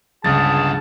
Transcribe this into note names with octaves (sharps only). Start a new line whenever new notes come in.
C#2 G2 D3 G#4 A5 A6